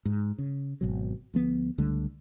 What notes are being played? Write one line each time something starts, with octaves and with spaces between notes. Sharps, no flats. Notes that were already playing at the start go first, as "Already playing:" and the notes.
G#2
C#3
G#1 B2 F#3
D2 F3 B3
C#2 D3 G3 A3